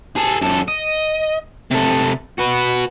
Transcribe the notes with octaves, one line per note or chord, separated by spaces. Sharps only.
G#4 A4
F#2 A4
D#5
C3 A4
F#4 B4